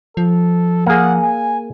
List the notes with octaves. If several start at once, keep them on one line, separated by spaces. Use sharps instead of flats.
F3 A4
A#3 G#4 F#5
G#5